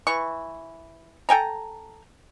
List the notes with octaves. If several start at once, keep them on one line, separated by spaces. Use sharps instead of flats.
E3 C#6
A4 G5 G#5 A#5